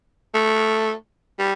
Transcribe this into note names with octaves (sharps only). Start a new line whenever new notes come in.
A3
G3